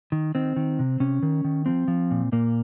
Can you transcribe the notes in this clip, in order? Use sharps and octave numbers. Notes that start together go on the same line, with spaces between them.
D#3
D#3 C4
D#3
C3
C3 C#4
D#3
D#3
F3 C4
F3
A#2
A#2 A#3